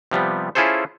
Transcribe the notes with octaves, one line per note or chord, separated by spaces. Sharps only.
C3 F3 G3 B3
C#4 E4 F4 G#4 A4 C5